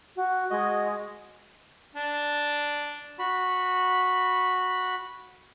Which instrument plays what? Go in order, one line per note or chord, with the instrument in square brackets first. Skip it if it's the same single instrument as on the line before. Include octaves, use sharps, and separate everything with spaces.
[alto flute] F#4
[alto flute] G#3 [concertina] F#4 D#5
[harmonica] D4
[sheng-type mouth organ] F#4 B5